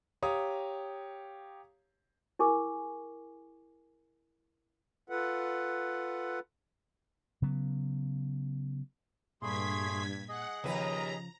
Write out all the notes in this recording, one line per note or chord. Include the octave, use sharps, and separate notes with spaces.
G4 C#5 F5 A#5 D#6
E4 G#4 A#4 G#5 C#6 D6
F4 A4 B4 F#5
C#3 F#3 B3
G2 A#2 A3 G#4 B5 C6 G#6 B6
G#4 D#5 F#5
D#2 C#3 F3 B4 A#5